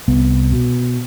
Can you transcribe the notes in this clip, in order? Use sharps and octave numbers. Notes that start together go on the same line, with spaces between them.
C2 B3
B2